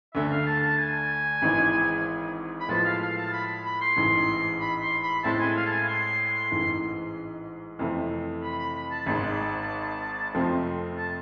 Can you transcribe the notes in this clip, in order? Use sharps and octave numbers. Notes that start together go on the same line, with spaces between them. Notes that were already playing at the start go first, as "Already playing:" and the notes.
D2 D3 A3 E5
F5
A5
A5
G#5
G#1 G#2 E3 G#3
B5
A2 F3 G#3 B3 A5
F5
F5
A5
B5
B5
C6
A1 G#2 E3
B5
C6
B5
A2 G#3 C4 E4 A5
G#5
F5
A5
G#5
C6
A1 G#2 E3
F2 C3 E3 A3
B5
B5
B5
A5
G#1 G#2 G#3 A5
F2 C3 F3 A3 C4
A5